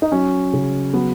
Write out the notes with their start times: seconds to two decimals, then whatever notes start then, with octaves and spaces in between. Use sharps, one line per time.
0.02 D#4
0.12 F#3 C#4
0.53 C#3
0.94 F#3 B3